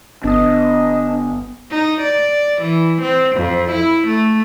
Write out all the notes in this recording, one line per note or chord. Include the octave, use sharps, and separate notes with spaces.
G1 B3 D4 D#5 D#6
D#4
D5
E3
C4
F2
E4
A3